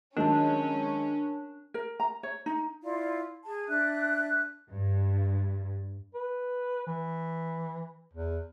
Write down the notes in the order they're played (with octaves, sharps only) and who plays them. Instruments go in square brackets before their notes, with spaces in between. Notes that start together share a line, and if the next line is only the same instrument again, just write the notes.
[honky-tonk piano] D#3 F#3 G#3 [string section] C#4 [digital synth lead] D4 [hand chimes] A#4 A5
[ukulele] A#4
A#5
C#5
D#4
[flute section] E4 F4 D5 F5
G#4 A5
D4 E5 F#6
[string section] G2
[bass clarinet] B4
E3
E2